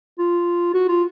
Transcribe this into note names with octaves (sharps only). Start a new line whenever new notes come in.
F4
F#4
F4